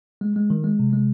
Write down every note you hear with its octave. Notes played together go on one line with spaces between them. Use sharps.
G#3
G#3
D#3
G#3
C3
G#3